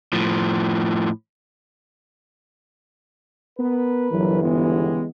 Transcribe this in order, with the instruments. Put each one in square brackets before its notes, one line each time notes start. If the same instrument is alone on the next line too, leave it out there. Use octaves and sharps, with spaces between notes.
[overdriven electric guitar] A2 F3
[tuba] B3 [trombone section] A#4 B4
[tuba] G1 [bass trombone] E3 [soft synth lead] F#3
[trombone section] C#3 G3 G#3 [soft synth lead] B3